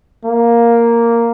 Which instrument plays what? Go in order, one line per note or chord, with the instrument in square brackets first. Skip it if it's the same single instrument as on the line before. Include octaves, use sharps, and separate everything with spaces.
[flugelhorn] A#3